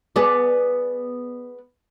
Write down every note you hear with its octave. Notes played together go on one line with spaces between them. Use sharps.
B3 G#4 D5